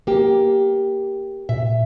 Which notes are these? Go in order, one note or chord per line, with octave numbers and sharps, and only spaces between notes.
A#3 G4
A#2 E5